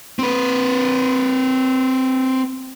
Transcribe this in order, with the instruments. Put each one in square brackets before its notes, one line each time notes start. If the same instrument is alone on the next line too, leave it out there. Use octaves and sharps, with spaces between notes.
[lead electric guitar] C4 B4